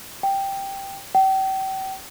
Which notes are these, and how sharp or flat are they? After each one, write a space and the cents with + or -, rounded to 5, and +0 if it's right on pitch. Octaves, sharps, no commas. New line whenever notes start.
G5 +0
G5 -35